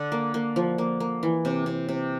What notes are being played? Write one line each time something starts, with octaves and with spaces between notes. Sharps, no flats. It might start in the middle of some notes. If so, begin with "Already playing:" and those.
Already playing: D3
A#3
A#3
F3
A#3
A#3
E3
C3
C3
C3